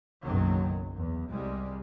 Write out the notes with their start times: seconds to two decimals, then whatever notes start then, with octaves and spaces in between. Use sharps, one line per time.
0.21 F#1 B1 F#2 D#3 F#3
0.95 E2
1.29 C2 G3 G#3